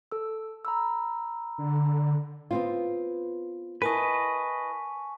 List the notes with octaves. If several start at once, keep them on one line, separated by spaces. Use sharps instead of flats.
A4 E6
A#5 B5 E6
D3
B3 C4 F4
E4 A#4 B4 D#5 G#5 A5 C#6